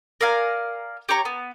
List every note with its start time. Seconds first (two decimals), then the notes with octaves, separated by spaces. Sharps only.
0.21 A#4 D5 F5 G#5
1.09 G4 C#5 A#5 C#6
1.25 B3